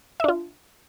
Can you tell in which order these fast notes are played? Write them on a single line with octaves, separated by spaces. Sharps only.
E5 D4 F4